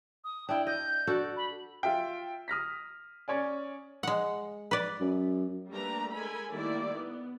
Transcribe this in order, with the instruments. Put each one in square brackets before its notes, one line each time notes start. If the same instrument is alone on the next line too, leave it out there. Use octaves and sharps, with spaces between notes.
[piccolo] D#6
[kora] D4 E4 [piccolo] G5
[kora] D#5 [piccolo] G6
[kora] D4 F#4 A4
[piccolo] B5
[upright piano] F4 E5 G5
D#6 F6 A#6 B6
C#4 C#5 D5 G#5
[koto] G#3 F#5
B4 D5
[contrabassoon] F#2
[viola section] G3 A3 A#3 D4 B4 A#5
G#3 A4 A#4 G#5 B5
D#3 G3 A3 A#3 E4 D5
B3